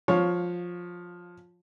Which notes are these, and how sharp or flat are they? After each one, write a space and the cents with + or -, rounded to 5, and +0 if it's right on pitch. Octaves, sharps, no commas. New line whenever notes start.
F3 +10 C#5 +0 F5 +25